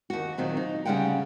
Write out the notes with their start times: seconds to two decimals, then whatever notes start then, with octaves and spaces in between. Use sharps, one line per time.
0.10 D#2 F#4
0.38 A#2 D#3 F#3 C4
0.57 D#4
0.85 D2 C#3 G3 G#3 F#5 G5